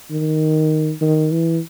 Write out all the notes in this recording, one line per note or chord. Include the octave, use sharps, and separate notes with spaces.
D#3
D#3
E3